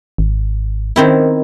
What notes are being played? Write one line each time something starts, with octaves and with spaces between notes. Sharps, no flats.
G#1
D#3 C4 E4